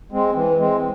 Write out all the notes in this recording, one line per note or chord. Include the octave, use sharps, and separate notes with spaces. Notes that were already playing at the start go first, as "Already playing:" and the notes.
G#3 C4
E3
G#3 C4